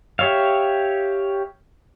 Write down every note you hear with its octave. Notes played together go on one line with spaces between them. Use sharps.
G4 C#5 E5 F5